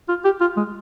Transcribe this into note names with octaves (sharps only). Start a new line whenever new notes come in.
F4
G4
F4
G#3